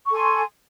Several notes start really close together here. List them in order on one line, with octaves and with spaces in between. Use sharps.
C#6 A4 G#5 C6